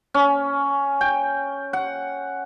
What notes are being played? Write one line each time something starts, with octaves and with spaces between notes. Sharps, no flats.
C#4
G5
F#5